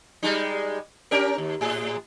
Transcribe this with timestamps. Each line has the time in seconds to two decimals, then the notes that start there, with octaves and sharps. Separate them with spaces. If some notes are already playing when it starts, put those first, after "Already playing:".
0.23 G3 G#3 D#4
1.11 C#4 G4 A#4
1.38 D#2
1.61 A2 G#4